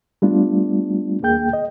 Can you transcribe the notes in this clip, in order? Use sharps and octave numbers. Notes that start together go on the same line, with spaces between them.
G3 A3 B3 D4 F4
D#2 A#3 G#4 G5 G6
D#5